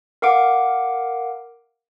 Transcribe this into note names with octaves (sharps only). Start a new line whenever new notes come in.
A#4 F5 F#5 D6 D7